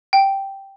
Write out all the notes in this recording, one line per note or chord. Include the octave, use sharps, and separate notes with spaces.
G5